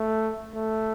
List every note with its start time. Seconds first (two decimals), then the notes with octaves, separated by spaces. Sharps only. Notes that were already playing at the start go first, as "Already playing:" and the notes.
Already playing: A3
0.54 A3